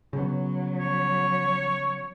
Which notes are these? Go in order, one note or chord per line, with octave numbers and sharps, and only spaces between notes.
C#3 F#3 B3
C#5